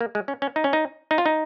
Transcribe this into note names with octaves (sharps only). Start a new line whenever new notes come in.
A#3
G#3
C#4
C#4
D#4
C#4
D#4
D#4
F4
D#4